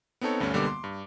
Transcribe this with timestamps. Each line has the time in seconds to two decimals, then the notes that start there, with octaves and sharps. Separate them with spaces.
0.21 B3 C4 D#4 A4 C#5
0.40 D2 G2 A3 C#4 D4
0.53 B1 D3 G3 A#3 B3 D6
0.67 C6
0.84 G2